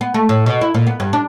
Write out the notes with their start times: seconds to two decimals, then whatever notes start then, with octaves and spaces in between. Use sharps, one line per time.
0.01 B3
0.14 A3
0.29 A2
0.46 B2
0.61 E4
0.74 A#2
0.87 B3
1.00 G2
1.13 D4